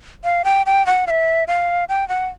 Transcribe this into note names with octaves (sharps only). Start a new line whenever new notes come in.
F5
G5
G5
F#5
F5
E5
F5
G5
F#5